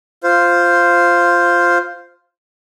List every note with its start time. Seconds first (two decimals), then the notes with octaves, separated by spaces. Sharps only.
0.23 F4 C5